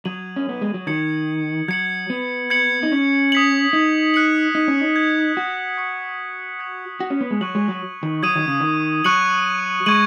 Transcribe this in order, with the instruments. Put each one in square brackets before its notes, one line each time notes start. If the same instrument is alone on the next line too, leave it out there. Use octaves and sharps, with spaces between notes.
[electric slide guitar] F#3 [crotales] D#6 G#6 D#7 F#7
[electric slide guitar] C#4
B3
G#3
F#3
[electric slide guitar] D#3 [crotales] G#6 C#7 F#7
[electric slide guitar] F#3 [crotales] G#6 C#7 F#7
[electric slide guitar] B3
[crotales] G#6 C#7 F#7
[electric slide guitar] D#4
C#4
[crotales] D#6 B6 F#7
[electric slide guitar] D#4
[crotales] F#6 C#7 F#7
[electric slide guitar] D#4
C#4
D#4
[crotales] G#6 B6 F#7
[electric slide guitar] F#4
[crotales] C#6 G#6 C#7 F#7
D#6 G#6 C#7 F#7
[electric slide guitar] F#4
C#4
B3
G#3
[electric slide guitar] F#3 [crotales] C#6 F#6 C#7 F#7
[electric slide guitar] G#3
F#3
D#3
[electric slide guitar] F#3 [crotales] D#6 G#6 D#7 F#7
[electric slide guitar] D#3
C#3
D#3
[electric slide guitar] F#3 [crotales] C#6 F#6 C#7 F#7
[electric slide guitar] G#3 [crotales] C#6 G#6 D#7 F#7